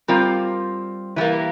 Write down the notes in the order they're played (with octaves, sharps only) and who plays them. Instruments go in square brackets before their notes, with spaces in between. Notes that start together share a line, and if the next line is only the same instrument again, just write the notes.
[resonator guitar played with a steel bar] G3 C4 F4 A#4 D5
E3 G3 A#3